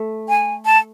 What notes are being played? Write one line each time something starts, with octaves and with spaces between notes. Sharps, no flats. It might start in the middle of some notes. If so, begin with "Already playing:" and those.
Already playing: A3
G#5
A5